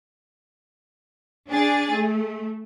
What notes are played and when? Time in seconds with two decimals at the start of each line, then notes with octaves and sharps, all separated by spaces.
1.50 D4 G#4 A6
1.93 A3